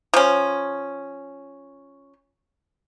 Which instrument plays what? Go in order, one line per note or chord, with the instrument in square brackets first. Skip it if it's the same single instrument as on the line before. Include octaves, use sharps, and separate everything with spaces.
[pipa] F3 C#4